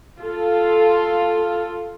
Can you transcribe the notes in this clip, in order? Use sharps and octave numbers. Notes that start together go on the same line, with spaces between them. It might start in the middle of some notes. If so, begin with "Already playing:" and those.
F4 A4